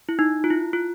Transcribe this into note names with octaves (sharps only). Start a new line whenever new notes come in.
E4
D#4
F4
E4
F4